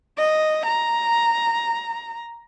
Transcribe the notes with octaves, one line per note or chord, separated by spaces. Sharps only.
D#5
A#5